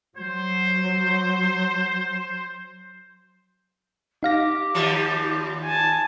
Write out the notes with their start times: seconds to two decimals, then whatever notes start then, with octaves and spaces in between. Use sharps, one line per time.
0.17 F#3 C5
4.23 D#4 G4 F5 A#6
4.74 D#2 F3 G3
5.64 G#5 A5